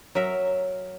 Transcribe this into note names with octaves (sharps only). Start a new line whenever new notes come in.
F#3 A#4 E5